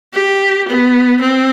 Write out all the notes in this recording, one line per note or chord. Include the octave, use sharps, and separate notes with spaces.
G4
B3
C4